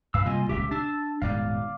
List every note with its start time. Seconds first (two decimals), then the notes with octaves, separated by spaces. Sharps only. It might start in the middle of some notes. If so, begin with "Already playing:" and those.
0.14 G2 B4 F5 E6
0.26 C3 G3 A#3 F4 D#5 G#5
0.49 D#1 C#2 G4 E5
0.71 D4 A5 E6
1.22 D#1 G#2 B2 D5 F5